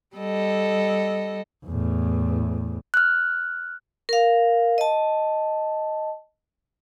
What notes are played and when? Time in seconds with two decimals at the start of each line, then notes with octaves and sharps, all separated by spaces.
0.16 G3 A4 D#5
1.66 E2 A2
2.94 F6 F#6
4.09 A#4 F5
4.78 D#5 A5